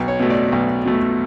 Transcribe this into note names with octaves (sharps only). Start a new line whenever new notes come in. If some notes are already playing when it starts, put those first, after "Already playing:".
Already playing: B1
C#5
B2 A3
D5
B1
B2 A3